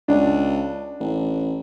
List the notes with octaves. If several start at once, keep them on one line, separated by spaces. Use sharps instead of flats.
C#2 D4
A1